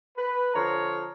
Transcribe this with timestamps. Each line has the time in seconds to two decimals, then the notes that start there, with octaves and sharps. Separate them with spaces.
0.17 B4
0.55 D3 F3 C#5 A#5